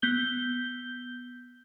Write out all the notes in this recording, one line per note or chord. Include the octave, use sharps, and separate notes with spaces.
B3 G6 G7